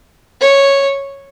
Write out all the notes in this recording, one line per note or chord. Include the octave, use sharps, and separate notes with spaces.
C#5